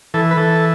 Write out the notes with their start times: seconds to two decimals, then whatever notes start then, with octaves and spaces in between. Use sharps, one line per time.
0.14 E3 A4
0.31 B4
0.37 E3 A4